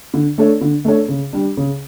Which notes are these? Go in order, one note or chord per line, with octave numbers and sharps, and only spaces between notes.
D3
A3 D4 A4 C#5
D3
A3 D4 A4 C#5
C#3
G3 D4
C#3